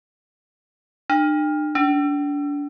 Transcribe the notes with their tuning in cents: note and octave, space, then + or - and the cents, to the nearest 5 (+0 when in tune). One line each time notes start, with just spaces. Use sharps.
D4 +45
D4 -30